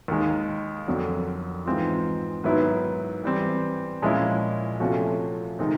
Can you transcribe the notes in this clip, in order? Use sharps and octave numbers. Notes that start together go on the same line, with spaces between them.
D#2 D#3 G#3
F2 D3 F#3
G#2 E3 G#3 C4 F4
G#2 D#3 F#3 B3 E4
E3 G3 C4
A#2 F3 G#3 C#4 E4
C3 F3 A3 C#4 F#4
C3 D#3 G#3 C4